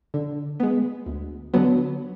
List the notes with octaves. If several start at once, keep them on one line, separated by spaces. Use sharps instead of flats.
D3
G#3 B3
D2
D3 F#3 B3